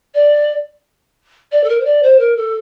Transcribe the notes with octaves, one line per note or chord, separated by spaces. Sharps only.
D5
D5
A4
A#4
C5
D5
C5
A#4
A4